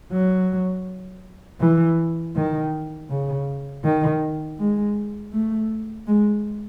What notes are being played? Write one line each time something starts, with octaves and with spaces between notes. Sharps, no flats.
F#3
E3
D#3
C#3
D#3
G#3
A3
G#3